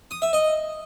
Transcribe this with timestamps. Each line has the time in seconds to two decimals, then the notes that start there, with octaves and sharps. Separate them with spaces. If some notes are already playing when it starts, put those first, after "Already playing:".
0.11 D#6
0.22 E5
0.33 D#5